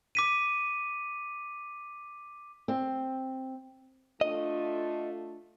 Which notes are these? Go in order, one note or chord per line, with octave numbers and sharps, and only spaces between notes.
D6 B6 D#7
C4
A3 D4 F4 D#5